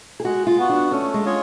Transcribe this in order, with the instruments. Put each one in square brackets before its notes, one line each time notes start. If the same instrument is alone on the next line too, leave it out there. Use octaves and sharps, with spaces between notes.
[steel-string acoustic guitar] G#4
[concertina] G#3 [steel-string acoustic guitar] F#4
[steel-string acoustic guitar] F4
[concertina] B3 F#4
[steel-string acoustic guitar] D4
[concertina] A3 [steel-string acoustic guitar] C#4
[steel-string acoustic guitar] G#3
[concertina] F4 G#4 C#5